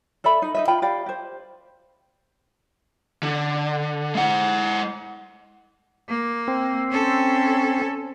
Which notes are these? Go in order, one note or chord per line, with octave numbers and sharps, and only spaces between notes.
A4 D5 E5 B5
D#4
D#4 D#5 E5
F4 G5 B5
G4 D5 F5 B5
G4 C5
D3
G#3 F#5
A#3
C4
C#4 A4